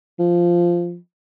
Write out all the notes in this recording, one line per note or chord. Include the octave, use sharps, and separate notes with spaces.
F3